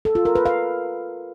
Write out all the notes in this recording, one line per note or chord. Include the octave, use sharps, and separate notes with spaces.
A4
F4
A#4
B4
F5